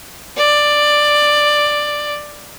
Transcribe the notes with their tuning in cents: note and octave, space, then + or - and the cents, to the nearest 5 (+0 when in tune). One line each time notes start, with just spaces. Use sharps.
D5 +10